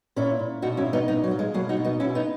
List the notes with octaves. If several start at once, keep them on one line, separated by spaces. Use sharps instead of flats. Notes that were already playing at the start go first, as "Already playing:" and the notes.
A#2 C#4 E4
A#2
B2 D#4 F#4
C#4 E4
B2
B3 D#4
A#2 B3 D#4
F#3
A#2
G#3
B2 F#3 A#3
D#4 F#4
B2
B3 D#4
B2 C#4 E4
B3 D#4